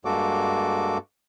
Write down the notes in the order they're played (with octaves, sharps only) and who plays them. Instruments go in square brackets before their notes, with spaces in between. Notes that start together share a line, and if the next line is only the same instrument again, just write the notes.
[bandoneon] G2 G#3 A#3 F#4 A4 D6